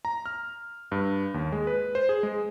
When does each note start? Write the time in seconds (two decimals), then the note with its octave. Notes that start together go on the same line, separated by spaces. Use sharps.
0.05 A#5
0.26 F6
0.92 G2
1.34 D#2
1.52 G#3
1.67 B4
1.95 C5
2.09 G#4
2.23 G#3